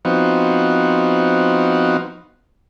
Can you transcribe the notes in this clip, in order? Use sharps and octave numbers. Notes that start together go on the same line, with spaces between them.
F3 B3 C4 D#4 F#4